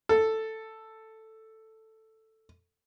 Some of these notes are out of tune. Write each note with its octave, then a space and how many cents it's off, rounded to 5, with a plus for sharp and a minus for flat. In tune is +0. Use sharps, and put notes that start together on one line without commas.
A4 +5